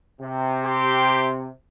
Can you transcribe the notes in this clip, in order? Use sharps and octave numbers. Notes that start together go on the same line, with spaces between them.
C3
G4 C6